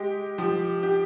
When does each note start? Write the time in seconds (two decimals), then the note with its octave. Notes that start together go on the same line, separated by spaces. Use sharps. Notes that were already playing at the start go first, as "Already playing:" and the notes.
Already playing: G#3 G4
0.38 F3 G4
0.83 G4